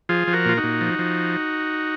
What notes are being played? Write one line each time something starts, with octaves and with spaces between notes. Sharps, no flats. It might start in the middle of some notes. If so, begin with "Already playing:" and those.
F3 F4 G#4
F3
F#4 A#4
A#2 F4
D#4 F#4
A#2
F3
F3